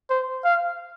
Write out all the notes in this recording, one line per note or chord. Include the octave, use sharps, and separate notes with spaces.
C5
F5